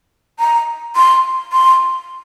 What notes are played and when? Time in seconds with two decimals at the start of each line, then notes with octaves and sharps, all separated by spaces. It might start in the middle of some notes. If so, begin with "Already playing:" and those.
0.39 A#5
0.96 C6
1.52 C6